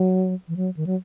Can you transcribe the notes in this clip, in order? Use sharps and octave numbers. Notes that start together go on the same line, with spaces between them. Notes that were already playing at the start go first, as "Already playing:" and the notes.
Already playing: F#3
E3
F#3
D#3
F#3